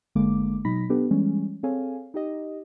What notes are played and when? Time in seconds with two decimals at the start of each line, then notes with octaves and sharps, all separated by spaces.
0.15 G1 D3 G#3 A#3 D6
0.65 B2 F#3 D#4 B5 A#6 B6
0.89 B3 D4 G4 A4 B4
1.11 E3 G3 G#3 C#4
1.63 C4 G#4 A4 C#5 F5 G#5
2.14 D#4 G4 D#5